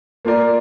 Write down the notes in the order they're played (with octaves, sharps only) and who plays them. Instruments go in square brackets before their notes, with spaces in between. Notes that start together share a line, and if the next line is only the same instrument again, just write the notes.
[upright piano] A#3 F4 A#4 D5